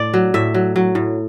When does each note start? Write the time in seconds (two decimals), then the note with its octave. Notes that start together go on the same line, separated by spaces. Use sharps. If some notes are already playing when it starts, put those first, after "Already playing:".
Already playing: A2 D5
0.14 F#3
0.34 A2 E5
0.54 F#3
0.76 F#3
0.95 A2